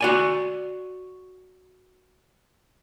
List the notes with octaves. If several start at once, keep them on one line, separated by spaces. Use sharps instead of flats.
F#4 D5 G#5